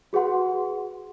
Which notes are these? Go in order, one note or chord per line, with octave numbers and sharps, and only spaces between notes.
F#4 G#4 B4 F#5 C6